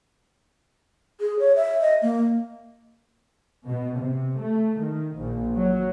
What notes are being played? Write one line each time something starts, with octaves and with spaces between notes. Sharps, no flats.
G#4
C#5
E5
D#5
A#3
B2
C3
A3
D#3
A#1
F#3